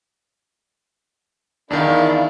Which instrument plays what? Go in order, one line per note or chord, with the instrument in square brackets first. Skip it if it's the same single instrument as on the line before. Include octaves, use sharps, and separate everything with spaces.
[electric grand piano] E2 D#3 [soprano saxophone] D4 [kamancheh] E4 F5